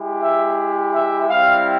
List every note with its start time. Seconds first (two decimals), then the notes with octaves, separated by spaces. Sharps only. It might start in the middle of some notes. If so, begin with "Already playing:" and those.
Already playing: G#3 E4 G4
0.20 E5
0.93 E5
1.29 G3 C4 E4 F5